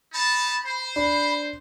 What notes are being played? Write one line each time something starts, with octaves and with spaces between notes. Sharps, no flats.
D#4 A5 B5
C5
D4 B5